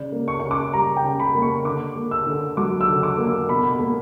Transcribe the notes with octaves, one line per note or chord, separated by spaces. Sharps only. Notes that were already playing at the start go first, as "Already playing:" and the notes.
Already playing: C#3 D5
A#3
C#6
C#3 C#6
D6
G3 A#5
G5
C#3
B5
A#3
C#6
D3 D6
A#3
E6
D3
F#3 D6
E6
D3
D6
A#3
E6
B2 B5
B5
A#3